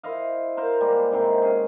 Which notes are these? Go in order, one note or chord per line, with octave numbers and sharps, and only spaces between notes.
E4 C5 D#5 F5
A#4 C5 F5
G3 G#3 A#3
G#2 C3 D#3 C4
C#4 G#4